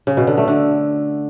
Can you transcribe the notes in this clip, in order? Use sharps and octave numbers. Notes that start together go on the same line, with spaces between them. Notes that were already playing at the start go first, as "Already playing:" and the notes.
C#3
B2
D3
A3
D3